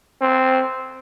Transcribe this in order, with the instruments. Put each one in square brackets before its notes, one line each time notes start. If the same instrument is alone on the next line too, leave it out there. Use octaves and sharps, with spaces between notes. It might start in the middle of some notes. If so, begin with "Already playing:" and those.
[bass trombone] C4